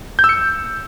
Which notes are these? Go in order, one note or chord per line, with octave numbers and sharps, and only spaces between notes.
G6
E6
C#7